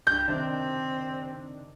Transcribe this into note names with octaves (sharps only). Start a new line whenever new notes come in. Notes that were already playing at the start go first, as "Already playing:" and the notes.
C2 G2 G6
F#1 C3 D#3 C4 D4